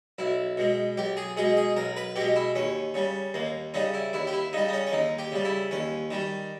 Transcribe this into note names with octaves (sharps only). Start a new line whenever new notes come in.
B1 E4
B2 G#3
B1 G4
G#4
B2 G#3 G#4
G#4
B1 A#4
B4
B2 G#3 G4
E4
D#2 C#4
C#3 G3
D#2 A#3
C#3 G3 D#4
E4
D#2 E4
G4
E4
C#3 G3 D#4
D#4
C#4
C#4
D#2 D#4
G4
C#3 G3
E4
D#2 C#4
D#3 G3